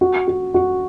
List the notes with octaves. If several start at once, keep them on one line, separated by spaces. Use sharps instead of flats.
F#4
F#4
F#4